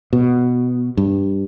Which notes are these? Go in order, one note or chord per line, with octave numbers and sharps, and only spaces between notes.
B2
G2